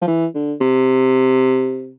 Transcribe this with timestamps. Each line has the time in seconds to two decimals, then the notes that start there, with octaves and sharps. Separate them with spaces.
0.02 F3
0.07 E3
0.35 D3
0.61 C3